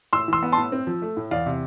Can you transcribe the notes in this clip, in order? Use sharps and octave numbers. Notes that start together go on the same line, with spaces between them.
A2 C6 E6
E3 C6 E6
B3
A5 C6
A2
C4
F3
A3
A2
E2 D5 F5
C3